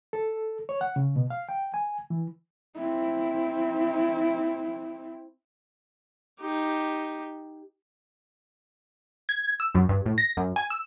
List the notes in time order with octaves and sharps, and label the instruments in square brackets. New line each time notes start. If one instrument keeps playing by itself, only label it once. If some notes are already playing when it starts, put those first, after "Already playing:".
[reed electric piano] A4
C#5
F#5
C#3
B2
F5
G5
G#5
E3
[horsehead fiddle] C4 E4
[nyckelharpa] D#4 G4
[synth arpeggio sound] G#6
E6
F#2
G2
A2
A#6
F#2
G#5
E6